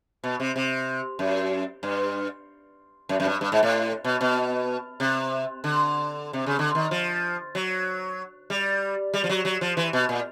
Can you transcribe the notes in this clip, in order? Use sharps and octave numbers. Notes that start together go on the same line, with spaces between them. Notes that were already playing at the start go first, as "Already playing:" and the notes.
B2
C3
C3
F#2
G2
F#2
F#2
G2
G2
G#2
A2
B2
B2
C3
D3
C3
C#3
D3
D#3
F3
F#3
G3
G3
F3
F#3
F#3
F3
E3
B2
A#2